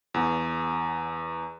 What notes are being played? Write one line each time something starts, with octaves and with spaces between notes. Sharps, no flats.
E2